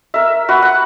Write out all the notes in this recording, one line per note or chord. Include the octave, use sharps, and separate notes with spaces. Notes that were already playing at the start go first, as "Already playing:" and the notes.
A#4 E5
F#4 B4 F#5
F#5